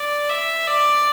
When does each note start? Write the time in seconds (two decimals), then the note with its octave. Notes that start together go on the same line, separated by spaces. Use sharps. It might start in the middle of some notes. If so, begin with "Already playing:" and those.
Already playing: D5
0.30 E5
0.67 D5